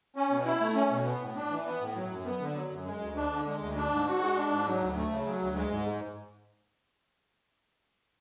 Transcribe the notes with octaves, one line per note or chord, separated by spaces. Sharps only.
C#4
B2
E4
A3
C#4
B2
B3
A2
D4
E3
B3
A2
F#3
F#2
B3
D3
F#3
F#2
G#3
D2
D4
D3
G#3
D2
D4
G#2
F#4
G#3
D4
G#2
F#3
D2
A3
C#3
F#3
D2
G#3
G#2